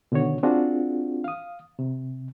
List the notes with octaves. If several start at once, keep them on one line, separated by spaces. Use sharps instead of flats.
B2 D3 D#3 F#4 C#5
C4 D4 F4 F#4 G#4
F5 D#6
C3